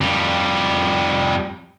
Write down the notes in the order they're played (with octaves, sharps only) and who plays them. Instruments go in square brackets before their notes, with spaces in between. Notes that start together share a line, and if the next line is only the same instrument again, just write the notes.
[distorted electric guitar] F2 G3